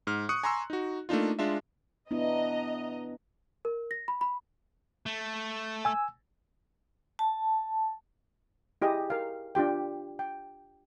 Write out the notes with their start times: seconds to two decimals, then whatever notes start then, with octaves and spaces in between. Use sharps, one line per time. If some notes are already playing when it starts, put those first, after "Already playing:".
0.07 G#2 F6
0.29 C#6 D#6 F#6 C#7
0.43 G#5 A#5 C6 C#6 E6
0.70 D#4 F#4
1.09 A3 A#3 D4 D#4 F4
1.39 G#3 D4 F4 E5
2.11 B3 D4 E4 D#5 A#5
3.65 A#4
3.91 A#6
4.08 B5
4.21 B5
5.06 A3
5.85 G#5 E6
7.19 A5
8.82 E4 G4 G#4 D#5
9.10 A#4 F5
9.55 D4 F4 G4 G5
10.19 G5